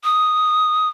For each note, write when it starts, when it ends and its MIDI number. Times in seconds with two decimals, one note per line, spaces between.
0.04 0.89 87